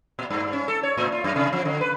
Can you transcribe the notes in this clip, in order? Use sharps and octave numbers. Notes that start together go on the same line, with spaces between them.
A#2
G2
C#4
A4
C#5
A2
F4
F#2
C3
F3
D3
B4